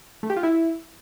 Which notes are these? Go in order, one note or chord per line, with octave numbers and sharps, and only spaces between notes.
A3
G4
F4
E4